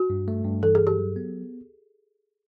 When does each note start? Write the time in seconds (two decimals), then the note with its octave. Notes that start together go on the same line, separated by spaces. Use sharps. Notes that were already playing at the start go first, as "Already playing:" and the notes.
Already playing: F#4
0.10 G2
0.28 A3
0.45 G2
0.63 E3 A4
0.75 G#4
0.81 G2
0.87 G4
0.99 F#3
1.16 B3